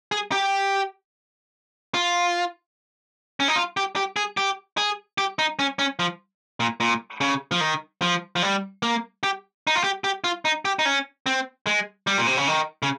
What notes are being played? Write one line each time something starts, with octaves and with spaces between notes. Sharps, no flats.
G#4
G4
F4
C#4
D#4
F4
G4
G4
G#4
G4
G#4
G4
D#4
C#4
C#4
F3
A#2
A#2
C#3
F3
D#3
F3
F3
G3
A#3
G4
D#4
F4
G4
G4
F4
D#4
G4
D#4
C#4
C4
G#3
G3
A#2
C3
C#3
D#3
C#3